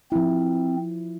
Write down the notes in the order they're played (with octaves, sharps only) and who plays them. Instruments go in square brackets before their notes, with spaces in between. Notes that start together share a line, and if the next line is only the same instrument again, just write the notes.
[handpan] F3 E4 [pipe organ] C4